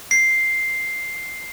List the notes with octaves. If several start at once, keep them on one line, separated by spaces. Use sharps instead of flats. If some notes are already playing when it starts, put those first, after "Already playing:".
C7